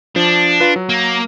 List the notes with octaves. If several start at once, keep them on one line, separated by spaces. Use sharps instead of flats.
F3 D4
F4 B4
F#3
A#3